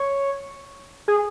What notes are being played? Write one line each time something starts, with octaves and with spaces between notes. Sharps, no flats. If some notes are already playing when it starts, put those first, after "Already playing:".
Already playing: C#5
G#4